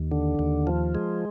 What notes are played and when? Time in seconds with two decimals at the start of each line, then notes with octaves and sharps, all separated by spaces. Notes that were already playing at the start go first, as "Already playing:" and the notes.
Already playing: D#2
0.12 D3
0.39 D#2
0.67 F3
0.95 G#3